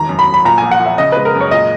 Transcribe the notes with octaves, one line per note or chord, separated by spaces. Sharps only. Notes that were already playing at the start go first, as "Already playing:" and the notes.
Already playing: E1 D#3 A#5
F#2
B5
F#2
B5
A#2 A#5
G#5
A#1
F#5
A#1
E5
C#3 D#5
B4
G#3
A#4
F#2
C#5
A#2 D#5